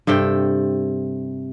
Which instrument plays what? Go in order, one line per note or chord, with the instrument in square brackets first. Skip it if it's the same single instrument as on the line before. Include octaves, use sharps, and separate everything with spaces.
[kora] G2 C3 A4 G5